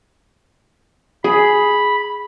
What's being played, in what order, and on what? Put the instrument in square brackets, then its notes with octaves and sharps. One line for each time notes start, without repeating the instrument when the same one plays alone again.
[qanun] G#4 [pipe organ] B5